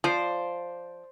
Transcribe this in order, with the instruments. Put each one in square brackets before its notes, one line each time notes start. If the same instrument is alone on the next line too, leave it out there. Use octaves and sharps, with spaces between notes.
[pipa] F3 [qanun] C5 D5